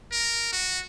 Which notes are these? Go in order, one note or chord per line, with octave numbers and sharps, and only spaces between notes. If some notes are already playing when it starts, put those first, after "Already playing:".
A#4
F#4